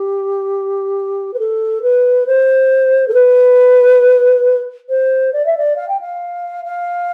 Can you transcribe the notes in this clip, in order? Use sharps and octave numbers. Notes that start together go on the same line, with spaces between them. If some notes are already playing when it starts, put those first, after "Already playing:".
Already playing: G4
B4
A4
B4
C5
A4
B4
C5
D5
E5
D5
F5
G5
F5
F5